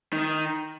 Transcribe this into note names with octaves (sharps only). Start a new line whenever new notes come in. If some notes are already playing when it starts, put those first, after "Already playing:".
D#3